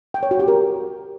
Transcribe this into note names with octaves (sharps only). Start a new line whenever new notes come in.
G5
C#5
F#4
G4
A#4